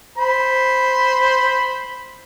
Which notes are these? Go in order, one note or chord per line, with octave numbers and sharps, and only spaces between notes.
C5 B5